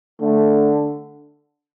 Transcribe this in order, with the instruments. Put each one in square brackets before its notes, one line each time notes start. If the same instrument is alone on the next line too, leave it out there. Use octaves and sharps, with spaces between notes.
[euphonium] D3 [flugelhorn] A3